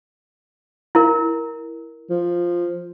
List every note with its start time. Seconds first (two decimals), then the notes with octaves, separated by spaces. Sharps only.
0.95 E4 A#4
2.10 F3